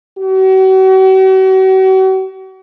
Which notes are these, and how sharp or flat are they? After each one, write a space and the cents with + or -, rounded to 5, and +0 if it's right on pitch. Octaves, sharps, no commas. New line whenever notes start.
F#4 +40